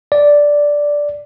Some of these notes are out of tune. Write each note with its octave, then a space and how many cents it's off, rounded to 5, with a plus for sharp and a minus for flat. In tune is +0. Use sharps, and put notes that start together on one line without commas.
D5 -5